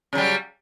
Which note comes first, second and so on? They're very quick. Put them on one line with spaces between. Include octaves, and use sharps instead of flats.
C#3 F#3 G3